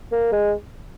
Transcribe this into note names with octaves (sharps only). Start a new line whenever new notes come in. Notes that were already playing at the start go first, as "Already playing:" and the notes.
A#3
G#3